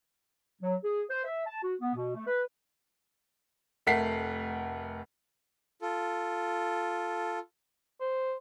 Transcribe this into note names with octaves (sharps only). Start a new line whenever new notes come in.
F#3
G#4
C5
E5
A5
F#4
B3
B2
A3
B4
F1 A3 A#4 F#5 B6 C7
F4 A4
C5